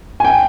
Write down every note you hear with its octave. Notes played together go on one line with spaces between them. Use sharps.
G#5
G5